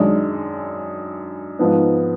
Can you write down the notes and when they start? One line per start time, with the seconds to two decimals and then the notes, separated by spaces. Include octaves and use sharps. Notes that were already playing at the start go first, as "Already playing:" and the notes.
Already playing: F#2 D#3 G#3 D4
1.59 G#2 F3 B3